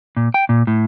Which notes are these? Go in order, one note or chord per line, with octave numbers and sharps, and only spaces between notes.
A#2
G5
A#2
A2